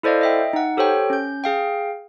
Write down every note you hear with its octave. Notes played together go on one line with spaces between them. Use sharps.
E4 A4 C5 D5 D#5 F5
D#5 E5 G5
D#4 F#5
G4 A4 C5 C#5 G5
C#4 G6
G#4 F5 G5